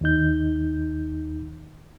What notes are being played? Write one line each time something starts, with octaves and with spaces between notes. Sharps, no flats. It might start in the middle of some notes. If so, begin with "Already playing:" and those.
D#2 D#3 D#4 G6